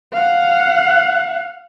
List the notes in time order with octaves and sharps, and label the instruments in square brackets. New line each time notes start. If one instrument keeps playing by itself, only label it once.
[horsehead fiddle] F5 F#5